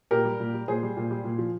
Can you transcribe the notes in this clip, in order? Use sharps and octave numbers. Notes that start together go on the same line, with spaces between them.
A#2 G4 A#4
G3
A#2
G3
A#2 G#4 C5
G3
A#2
G3
A#2
F3